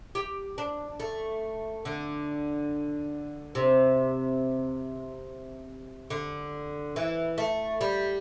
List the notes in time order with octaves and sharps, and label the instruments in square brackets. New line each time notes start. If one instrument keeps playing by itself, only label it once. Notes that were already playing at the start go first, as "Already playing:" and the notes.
[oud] G4
D4
A3
D3
C3
D3
E3
A3
G3